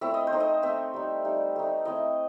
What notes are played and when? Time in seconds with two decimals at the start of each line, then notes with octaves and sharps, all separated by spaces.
0.01 A3 C4 E4 E5
0.14 D#5
0.27 C5
0.32 A3 C4 D#4
0.40 D#5
0.62 A3 C4 D#4 E5
0.94 G3 D#4
1.25 G3 D#4
1.56 A3 D#4
1.85 A3 C4 E4 D#5